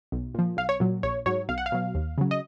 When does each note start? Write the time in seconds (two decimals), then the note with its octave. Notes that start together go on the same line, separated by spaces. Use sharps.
0.12 B1
0.34 A#2 F3
0.57 B1 F5
0.69 C#5
0.80 A#2 F#3
1.03 A#1 C#5
1.26 G#2 F#3 C#5
1.49 B1 F5
1.58 F#5
1.66 F5
1.72 B2 F#3
1.95 D#2
2.18 C#3 F#3
2.31 D#5